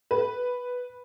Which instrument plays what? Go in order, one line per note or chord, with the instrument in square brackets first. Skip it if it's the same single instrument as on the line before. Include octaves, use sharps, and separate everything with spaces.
[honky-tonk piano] B4